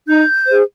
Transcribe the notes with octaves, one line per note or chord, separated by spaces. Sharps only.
D#4 G6
G#4 C5